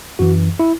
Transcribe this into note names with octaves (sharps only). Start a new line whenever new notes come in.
F#2 E3 F#4
E4